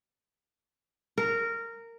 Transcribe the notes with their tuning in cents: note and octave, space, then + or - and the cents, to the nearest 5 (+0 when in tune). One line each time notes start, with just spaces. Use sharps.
A#4 -15